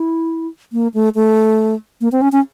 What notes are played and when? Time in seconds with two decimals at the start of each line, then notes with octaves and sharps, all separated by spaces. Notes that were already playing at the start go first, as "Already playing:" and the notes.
Already playing: E4
0.73 A#3
0.94 A3
1.15 A3
2.01 A#3
2.12 C4
2.22 C#4
2.32 C#4